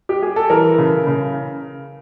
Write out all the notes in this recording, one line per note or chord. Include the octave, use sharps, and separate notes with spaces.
G4
G#4
A4
E3 A#4
C#3
C#3